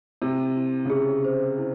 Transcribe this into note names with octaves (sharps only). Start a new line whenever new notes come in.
C3 E4
E4
C#3
C3 G#4
C5
E4